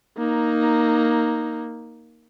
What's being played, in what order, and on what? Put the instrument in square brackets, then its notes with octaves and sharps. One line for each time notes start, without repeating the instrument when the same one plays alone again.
[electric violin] A#3 D#4